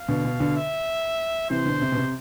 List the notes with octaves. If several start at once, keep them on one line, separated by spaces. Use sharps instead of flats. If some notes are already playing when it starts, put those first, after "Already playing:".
Already playing: F5
B2 D3
B2
B2 D3
E5
C3 E3 C5
B2 D3
C3
B2
C3